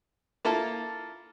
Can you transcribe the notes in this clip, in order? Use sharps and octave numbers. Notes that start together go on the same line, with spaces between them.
A#3 E4 F4 A4 A5 F6